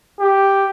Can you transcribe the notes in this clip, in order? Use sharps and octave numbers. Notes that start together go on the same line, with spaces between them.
G4